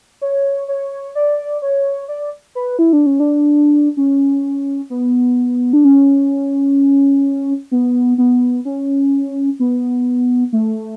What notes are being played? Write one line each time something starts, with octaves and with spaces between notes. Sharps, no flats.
C#5
C#5
D5
C#5
D5
B4
E4
D4
C#4
D4
C#4
B3
D4
C#4
B3
B3
C#4
B3
A3